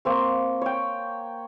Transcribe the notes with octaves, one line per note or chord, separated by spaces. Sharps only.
A#3 C4 C#6
C#5 G5